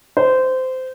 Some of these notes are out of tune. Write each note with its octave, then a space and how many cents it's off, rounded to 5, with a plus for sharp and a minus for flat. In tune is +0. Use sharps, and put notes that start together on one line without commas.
C5 -20